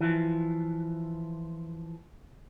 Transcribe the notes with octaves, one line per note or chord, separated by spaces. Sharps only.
E3 F3